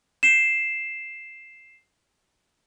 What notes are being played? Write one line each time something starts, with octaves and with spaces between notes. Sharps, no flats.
C7 E7